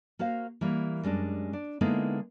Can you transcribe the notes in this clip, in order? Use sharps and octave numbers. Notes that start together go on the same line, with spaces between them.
A#3 F#4 C5 F5
E3 G3 A#3
F#2 G3 G#3 D4
D4
D3 G#3 A#3 B3 D#4 E4